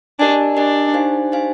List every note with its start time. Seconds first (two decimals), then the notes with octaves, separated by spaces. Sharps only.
0.19 D4 G4 A#4 D#5 G#5
0.56 D4 G4 A#4 D#5 G#5
0.94 D#4 G4 C5 F5 G#5
1.32 D#4 G4 C5 F5 G#5